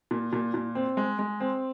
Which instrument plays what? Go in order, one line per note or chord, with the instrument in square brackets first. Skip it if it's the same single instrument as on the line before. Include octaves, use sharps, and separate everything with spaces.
[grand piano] A#2
A#2
A#2
C4
G#3
G#3
C4